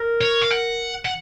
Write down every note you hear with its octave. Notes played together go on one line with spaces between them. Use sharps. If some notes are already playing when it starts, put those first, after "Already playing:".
Already playing: A#4
C#5
F5
F#5
F#5